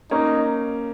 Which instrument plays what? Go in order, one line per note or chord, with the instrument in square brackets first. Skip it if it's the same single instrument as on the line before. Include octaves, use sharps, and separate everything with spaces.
[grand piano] A#3 C#4 [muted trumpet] D#4